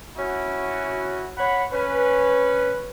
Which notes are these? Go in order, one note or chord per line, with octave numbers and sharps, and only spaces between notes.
C#4 E4 F#4
C#5 F#5 B5
C#4 B4